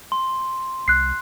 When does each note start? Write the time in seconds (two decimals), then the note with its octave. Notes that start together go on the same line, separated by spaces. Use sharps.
0.12 C6
0.88 C2 F#6 C7